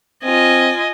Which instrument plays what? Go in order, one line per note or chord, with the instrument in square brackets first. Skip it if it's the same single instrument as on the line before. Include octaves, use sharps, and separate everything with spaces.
[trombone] C4 [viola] F4 G#5 [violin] D#5